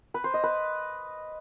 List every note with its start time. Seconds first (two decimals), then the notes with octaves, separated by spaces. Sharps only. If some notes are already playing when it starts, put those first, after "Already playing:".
0.14 B4
0.24 C5
0.34 D#5
0.44 B4